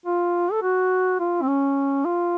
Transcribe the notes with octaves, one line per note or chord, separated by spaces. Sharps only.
F4
A4
F#4
F4
C4
C#4
F4